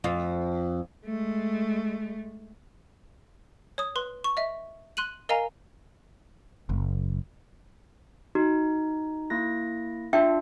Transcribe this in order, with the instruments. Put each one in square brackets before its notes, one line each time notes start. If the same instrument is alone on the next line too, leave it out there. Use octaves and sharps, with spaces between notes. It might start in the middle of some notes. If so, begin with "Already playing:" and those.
[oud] F2 F4
[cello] G#3 A3
[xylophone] C#5 D#6
B4 C6
C#6
D#5 E5
C6 F#6 D#7 F#7
A#4 D#5 F5 G#5 A#5
[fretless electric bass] F#1
[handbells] D#4 [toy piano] F#4
[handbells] A#3 E4 A#6
[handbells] D4 F4 A5 [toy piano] E5 G5